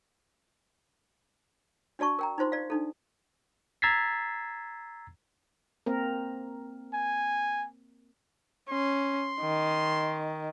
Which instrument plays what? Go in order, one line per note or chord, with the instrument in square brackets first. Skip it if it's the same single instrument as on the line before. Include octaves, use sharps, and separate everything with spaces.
[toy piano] D4 F#4 D5 A5 C#6
A#4 G5 A#5
D#4 F4 C5 C6
D5 F5
D4 D#4 A4
[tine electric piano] A#5 E6 G#6 A6 B6 C7
[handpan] A#3 C4 A#4
[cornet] G#5
[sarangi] C#4 [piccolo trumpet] C6
[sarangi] D#3